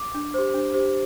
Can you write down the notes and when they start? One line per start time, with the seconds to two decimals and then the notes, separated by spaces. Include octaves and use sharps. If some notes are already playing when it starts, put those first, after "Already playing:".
Already playing: D6
0.14 D4
0.34 G4 C5
0.54 D4
0.74 G4 C5